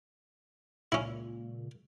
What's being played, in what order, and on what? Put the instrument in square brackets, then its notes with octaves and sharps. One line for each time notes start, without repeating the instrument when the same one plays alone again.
[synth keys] C#2 A#2 [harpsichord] C#4 E4